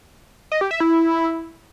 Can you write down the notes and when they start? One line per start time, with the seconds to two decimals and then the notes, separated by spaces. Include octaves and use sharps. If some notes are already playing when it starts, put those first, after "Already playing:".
0.52 D#5
0.61 G4
0.71 E5
0.80 E4